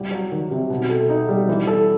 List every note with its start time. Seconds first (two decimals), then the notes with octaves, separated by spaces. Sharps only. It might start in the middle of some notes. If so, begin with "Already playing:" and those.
Already playing: C2 G3
0.11 F#3
0.32 D#3
0.51 C3
0.70 B2
0.90 A4
1.10 D#4
1.29 G3
1.49 E3
1.67 A4